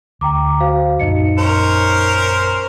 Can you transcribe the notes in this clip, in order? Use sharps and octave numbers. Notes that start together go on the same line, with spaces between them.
D2 G5 A#5 D6
F#4 C5 F5
A#1 F#2 D#4 D#5 C#7
C#4 A#4 C5